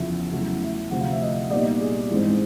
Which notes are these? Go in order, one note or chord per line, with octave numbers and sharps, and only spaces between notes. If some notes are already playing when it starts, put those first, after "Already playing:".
Already playing: E2 C#3 F3 E5
E2 C#3 F#3 A3
E5
D2 C3 F3 A3 C4 F#5
F5
E5
D#5
A#2 G3 B3 D#4 D5
G#4
G#2 E3 G#3 C4